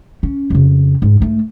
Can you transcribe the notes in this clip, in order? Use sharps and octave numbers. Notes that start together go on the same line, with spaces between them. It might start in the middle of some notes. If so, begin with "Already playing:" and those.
C#4
F2 C#3
G#2
G#2 A3